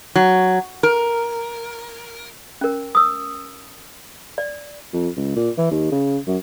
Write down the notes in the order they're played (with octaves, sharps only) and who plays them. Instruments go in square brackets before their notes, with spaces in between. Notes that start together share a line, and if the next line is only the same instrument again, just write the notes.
[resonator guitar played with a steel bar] F#3
A#4
[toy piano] C#4 A#4
D#6 E6
D5
[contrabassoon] F2
C#2
A#2
E3
D#2
C#3
F#2